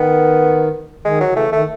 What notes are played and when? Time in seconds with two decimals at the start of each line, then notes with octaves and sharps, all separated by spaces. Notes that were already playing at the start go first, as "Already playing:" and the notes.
Already playing: D#3 B3
1.05 D#3 G#3
1.21 F#3
1.28 C#3 E3
1.36 A3
1.52 D#3 A3